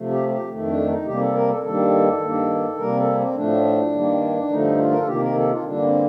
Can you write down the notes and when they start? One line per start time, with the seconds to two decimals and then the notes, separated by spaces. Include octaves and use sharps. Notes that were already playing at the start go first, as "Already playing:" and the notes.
Already playing: C3 F3 A3
0.10 G4
0.29 G4
0.48 F2 D#3 A3
0.67 D4
0.86 D#4
1.05 C3 G3 A#3 G4
1.20 A4
1.34 A#4
1.49 A4
1.63 G2 D#3 G3 A#3 A4
2.20 G2 D#3 A#3
2.78 C3 G3 A#3 A#4
2.97 A4
3.16 C4
3.35 A2 F3 A3 D4
3.92 G2 D#3 G3 A#3
4.49 G2 D3 F3 A3 D#4
4.78 F4
4.91 A#4
4.99 A4
5.06 C3 D#3 A#3 G4
5.21 A#4
5.35 A4
5.49 F4
5.63 G2 D3 G3 A#3 D4
5.83 C4